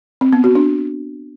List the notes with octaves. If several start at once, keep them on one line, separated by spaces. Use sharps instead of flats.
C4
B3
F#4
D4